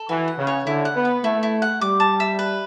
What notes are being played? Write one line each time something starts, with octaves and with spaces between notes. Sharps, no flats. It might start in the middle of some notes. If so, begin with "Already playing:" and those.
Already playing: A4
E3 F#4
F#5
C#3
C#5
D3 E4
F#5
B3
B4
A3 E4
E4
F#5
G3 D6
A5
E5
B4